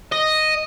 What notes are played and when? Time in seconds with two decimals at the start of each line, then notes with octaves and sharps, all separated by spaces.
0.12 D#5